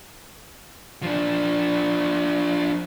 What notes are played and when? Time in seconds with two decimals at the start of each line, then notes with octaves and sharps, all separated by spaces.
1.03 F3 D4